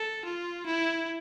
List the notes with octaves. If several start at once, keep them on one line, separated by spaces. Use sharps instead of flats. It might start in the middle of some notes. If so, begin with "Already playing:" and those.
Already playing: A4
F4
E4